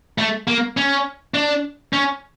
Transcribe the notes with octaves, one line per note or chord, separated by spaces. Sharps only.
A3
A#3
C#4
D4
C#4